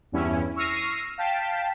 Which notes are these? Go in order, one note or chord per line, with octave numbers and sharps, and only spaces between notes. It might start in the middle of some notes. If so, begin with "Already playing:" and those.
E2 G2 C#4 E4
C#6 E6 F6 A#6 C7 D#7
F5 G5 A5 B6